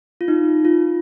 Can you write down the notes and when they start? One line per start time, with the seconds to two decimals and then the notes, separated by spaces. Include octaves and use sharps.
0.21 F4
0.28 D#4
0.65 F4